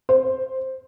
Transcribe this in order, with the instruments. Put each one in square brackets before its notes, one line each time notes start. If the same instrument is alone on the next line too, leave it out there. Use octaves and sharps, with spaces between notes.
[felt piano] C5